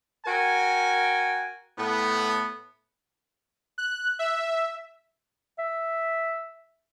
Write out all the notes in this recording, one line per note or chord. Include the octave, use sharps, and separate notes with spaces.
F#4 A#4 G5 G#5
A2 B3
F#6
E5
E5